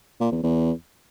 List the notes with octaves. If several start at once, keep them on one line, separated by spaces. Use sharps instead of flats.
A#2
E2
E2